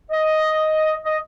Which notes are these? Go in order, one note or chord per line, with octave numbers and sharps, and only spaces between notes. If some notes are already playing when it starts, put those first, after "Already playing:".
D#5
D#5